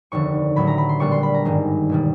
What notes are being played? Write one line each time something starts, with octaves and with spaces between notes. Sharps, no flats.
F1 D#2 D3 C#6
A1 A2 F#3 B5
A#5
B5
C6
A#1 A#2 G3 B3 D4 C#6
C6
B5
A#5
G#1 G2 D#3 G#3
E1 B2 G3